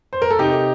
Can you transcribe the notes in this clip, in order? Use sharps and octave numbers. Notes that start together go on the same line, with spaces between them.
C5
A#4
A4
C3 D#4 G4